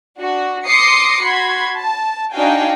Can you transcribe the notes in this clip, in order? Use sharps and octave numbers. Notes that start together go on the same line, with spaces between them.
D4 F#4
C6 D6 D#6 A#6 C7 C#7
F#4 B5 C6 G#6
A5
D4 D#4 F#4 F5 G5 G#5